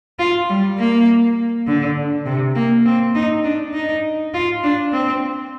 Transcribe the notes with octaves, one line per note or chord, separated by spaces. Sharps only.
F4
G3
A#3
D3
C3
A#3
C4
D#4
D4
D#4
F4
D4
C4